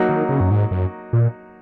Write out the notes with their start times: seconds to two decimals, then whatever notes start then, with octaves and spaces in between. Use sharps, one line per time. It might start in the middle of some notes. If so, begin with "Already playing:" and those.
Already playing: F#3 A#3 D#4 F#4
0.09 D#3
0.29 C#3
0.40 F#2
0.51 G#2
0.71 F#2
1.13 A#2